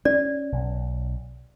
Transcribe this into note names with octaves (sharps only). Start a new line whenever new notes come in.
C#4 D5
B1